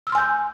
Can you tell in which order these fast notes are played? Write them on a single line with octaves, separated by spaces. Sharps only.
E6 F6 C6 G#5 G6